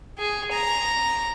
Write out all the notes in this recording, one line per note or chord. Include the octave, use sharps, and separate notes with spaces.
G#4
A#5